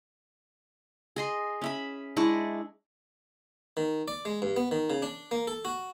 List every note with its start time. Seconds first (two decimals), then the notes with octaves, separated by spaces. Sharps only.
1.16 G#4 D#5 C6
1.61 C#4 E5 B5
2.16 G#3 D4 E4 C#6
3.77 D#3
4.08 D5
4.25 G#3
4.42 G2
4.56 B3
4.71 D#3
4.90 C#3
5.02 D4
5.31 A#3
5.47 A4
5.65 F#4